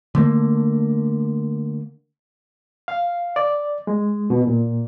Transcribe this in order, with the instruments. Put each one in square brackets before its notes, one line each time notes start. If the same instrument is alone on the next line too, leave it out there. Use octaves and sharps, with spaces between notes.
[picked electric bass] D3 A3 A#3
[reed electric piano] F5
D5
G#3
B2
A#2